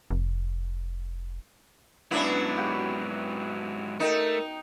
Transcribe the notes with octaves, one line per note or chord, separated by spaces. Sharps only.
F1
G#2 F#3 B3 C#4 D4 E4 E5
F#4 G4 G5
A3 D#4 A#4 D#5 G5